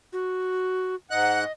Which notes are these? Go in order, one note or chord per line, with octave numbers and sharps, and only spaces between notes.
F#4
G#2 D#5 F#5 F#6